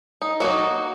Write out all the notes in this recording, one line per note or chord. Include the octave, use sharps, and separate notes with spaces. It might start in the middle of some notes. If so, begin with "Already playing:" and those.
D#4
F#3 A#3 D#4 F#4